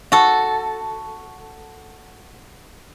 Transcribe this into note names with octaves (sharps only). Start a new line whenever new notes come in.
F#4 A4